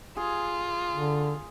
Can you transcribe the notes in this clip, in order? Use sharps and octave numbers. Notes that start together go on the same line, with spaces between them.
F4 G#4
D3